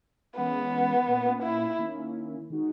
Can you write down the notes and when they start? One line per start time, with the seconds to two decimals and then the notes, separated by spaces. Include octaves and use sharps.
0.36 E3 G#3 B3 C#4
1.07 A#2 A#3 C#4
1.43 E4
1.79 D#3 A#3 C#4 E4
2.50 D#3 G#3 D#4 F#4